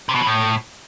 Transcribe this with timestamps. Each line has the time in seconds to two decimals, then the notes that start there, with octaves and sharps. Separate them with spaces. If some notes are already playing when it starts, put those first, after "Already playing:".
0.09 C3
0.15 B2
0.21 E3
0.26 A2